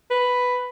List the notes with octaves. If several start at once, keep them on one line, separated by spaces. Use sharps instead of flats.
B4